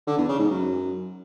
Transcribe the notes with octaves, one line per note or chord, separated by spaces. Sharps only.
D3
E2
C#3
G#2
F#2